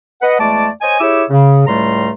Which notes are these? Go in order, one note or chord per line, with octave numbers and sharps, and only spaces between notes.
B4 D#5 F#5
E2 G#3 A3 D5 A5 D6
C5 C#5 D#5 G#5
E4 G4 G#4 C#5 D6 E6
C#3
C#2 A2 G3 A3 A#5 C6